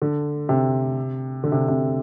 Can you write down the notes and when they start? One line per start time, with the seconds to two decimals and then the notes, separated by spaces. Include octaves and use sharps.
0.02 D3
0.49 C3
1.44 D3
1.52 C3
1.68 C3